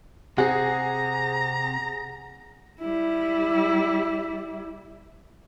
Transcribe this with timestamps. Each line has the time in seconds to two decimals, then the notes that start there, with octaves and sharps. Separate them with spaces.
0.38 C3 C4 G#4 F#5 A#5
2.81 G3 E4